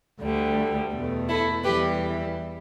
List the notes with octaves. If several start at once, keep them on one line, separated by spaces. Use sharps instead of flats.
D2 D3 G3
E2 B2 A3
E4 A4
E2 E3 G3 G4 B4